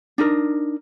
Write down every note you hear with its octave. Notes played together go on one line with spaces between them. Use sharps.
D4 D#4 A#4